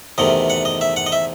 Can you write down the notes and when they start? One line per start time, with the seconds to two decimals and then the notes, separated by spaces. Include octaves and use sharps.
0.18 E2 C3 D#3 A3 D#5
0.50 F#5
0.65 D#5
0.81 E5
0.96 F#5
1.06 D#5
1.12 E5